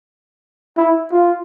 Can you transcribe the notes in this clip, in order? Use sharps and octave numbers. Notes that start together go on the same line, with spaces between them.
E4
F4